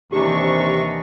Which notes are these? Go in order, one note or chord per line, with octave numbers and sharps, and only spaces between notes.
D#2 C3 E3 D4 D#4 G4 A#5 C#6